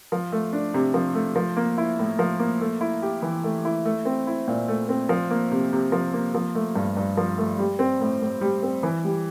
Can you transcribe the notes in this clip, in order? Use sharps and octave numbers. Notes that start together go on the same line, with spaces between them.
F3
A3
D4
C3
F3
A3
F3
A#3
E4
A2
F3
A#3
A3
E4
G4
E3
A3
E4
A3
C4
E4
A#2
A3
C4
F3
A#3
C3
C3
F3
A#3
F3
A3
G2
G2
F3
A3
G3
C4
A2
A2
G3
C4
E3
G3